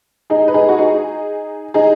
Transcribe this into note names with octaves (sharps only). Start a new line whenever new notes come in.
D#4 G#4
B4
D#4 G#4
F#4
D#4 G#4
D#4 G#4